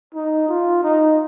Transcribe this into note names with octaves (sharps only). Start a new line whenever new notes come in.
D#4
F4
D#4